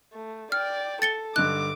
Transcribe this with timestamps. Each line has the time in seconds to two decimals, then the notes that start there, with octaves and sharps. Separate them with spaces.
0.13 A3
0.52 D5 G5 F6
1.02 A4 A6 C#7 G7
1.36 G2 D3 D#4 D6 F#6